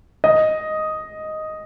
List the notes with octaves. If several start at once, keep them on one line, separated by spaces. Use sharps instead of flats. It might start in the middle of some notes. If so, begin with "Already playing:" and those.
D#5